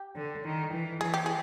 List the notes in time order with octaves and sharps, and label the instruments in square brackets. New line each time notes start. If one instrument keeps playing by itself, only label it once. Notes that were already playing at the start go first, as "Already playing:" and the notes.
Already playing: [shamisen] G4
[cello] D3
D#3
E3
[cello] E3 [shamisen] G#4
[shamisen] G4
G#4